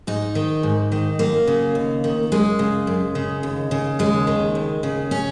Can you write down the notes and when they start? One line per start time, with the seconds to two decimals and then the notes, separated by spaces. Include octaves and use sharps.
0.07 G#2 D#4
0.35 D#3
0.63 G#2
0.92 D#3
1.19 F#2 A#3
1.47 C#3
1.75 D#2
2.04 D#3
2.32 F#2 G#3
2.59 C#3
2.87 F#2
3.15 C#3
3.43 D#2
3.71 C#3
3.99 D#2 G#3
4.27 D#3
4.55 D#2
4.83 C#3
5.11 C#4